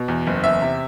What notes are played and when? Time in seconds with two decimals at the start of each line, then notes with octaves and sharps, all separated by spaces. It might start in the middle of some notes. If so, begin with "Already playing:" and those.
Already playing: B2
0.08 E2
0.27 F#1
0.44 E2 E5
0.62 C3